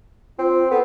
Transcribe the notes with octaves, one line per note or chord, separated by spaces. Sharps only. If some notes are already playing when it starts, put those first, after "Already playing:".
C4 F4
B3 A4